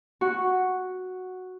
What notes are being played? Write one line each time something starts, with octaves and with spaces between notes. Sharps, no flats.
F#4